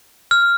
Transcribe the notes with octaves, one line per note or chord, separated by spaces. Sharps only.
F6